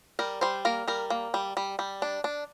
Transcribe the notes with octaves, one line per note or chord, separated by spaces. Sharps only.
G3 A#4
G3 C5
A#3 A#4
G3 A#4
A#3
G3
G3
G3
D4
D4